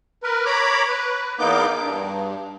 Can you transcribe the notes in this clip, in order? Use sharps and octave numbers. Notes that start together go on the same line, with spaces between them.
A#4 B4
C#5 A#5 B5 D6
B4
E2 A#3 B3 D#4 D6 G6
G2